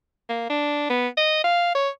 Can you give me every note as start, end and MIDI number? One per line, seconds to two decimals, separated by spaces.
0.29 0.47 58
0.50 0.89 62
0.90 1.08 59
1.17 1.41 75
1.44 1.74 77
1.75 1.89 73